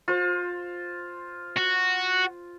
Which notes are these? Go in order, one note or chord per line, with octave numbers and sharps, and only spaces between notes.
F4 C5
F#4